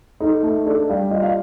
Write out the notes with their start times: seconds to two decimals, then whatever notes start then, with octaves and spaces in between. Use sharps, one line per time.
0.20 D#4 A4
0.43 A3
0.66 D4 A4
0.89 G3 F5
1.11 F4 D#5
1.22 F5